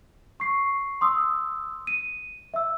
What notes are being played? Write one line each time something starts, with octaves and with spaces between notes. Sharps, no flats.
C#6 C7
C6 D#6 E6
D#7
E5 E6